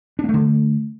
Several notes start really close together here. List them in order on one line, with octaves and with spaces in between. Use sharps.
D4 A#3 A3 D3